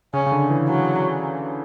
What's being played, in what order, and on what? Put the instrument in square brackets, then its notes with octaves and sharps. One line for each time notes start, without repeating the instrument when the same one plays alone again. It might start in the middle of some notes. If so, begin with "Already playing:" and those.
[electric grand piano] C#3 [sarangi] C#4
[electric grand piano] C#3
D3
E3
[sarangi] F#3